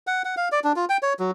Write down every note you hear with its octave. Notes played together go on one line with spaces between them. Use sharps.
F#5
F#5
F5
D5
D4
F4
G5
C#5
F#3